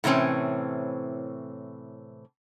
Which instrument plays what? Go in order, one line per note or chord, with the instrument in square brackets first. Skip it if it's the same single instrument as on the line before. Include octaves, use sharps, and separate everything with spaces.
[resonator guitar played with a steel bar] A2 C3 E3 C4 C#4